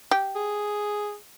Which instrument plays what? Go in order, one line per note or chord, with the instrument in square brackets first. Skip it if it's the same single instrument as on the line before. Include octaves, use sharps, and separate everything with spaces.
[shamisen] G4
[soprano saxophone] G#4